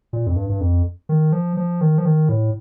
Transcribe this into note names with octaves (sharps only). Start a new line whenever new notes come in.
A#2
F2
G2
G2
F2
D#3
F3
F3
D#3
F3
D#3
A2